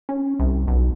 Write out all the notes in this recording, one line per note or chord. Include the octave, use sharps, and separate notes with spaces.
C#4
C2
B1